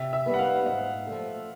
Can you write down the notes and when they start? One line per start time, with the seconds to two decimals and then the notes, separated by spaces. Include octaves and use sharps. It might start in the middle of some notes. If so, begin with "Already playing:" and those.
Already playing: C3 E5
0.13 E5
0.26 D#3 G3 B3
0.34 F#5
0.39 F5
0.66 G#2 F#5
1.07 F3 A3